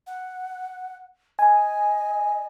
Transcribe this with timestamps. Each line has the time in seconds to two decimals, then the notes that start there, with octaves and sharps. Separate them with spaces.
0.07 F#5
1.39 D#5 G#5